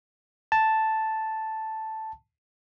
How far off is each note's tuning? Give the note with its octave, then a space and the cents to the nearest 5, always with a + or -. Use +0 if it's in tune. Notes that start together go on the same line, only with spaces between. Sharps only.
A5 +0